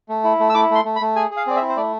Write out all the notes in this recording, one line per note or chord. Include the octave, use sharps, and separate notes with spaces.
A3
E4
A3
E6
E4 D6
A3 C6
A3
B5
A3
G#4 G#5
G#4
F5
C4 D5
E5
E4
C5
A3 D5